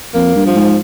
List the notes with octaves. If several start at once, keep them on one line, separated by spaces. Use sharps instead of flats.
F2 A#3
G2
F3
G#2